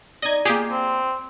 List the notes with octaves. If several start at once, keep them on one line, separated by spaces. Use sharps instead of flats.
D#4 D5 D#5 G#6
A#3 F4 G4 G#4
C4